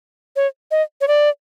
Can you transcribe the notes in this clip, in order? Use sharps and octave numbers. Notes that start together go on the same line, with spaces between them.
C#5
D#5
C#5
D5